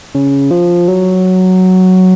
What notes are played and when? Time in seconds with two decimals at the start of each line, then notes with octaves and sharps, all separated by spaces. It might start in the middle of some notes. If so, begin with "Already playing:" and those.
0.15 C#3
0.51 F3
0.88 F#3